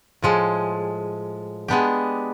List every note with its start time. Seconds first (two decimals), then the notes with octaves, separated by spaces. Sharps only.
0.22 A2 F3 G#3
1.68 G#3 B3 D4 G4